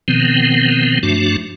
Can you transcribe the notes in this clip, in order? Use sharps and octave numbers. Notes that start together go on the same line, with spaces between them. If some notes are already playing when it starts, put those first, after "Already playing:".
B2 D#3 F3 B3 C4
G2 F3 A3 D4 F#4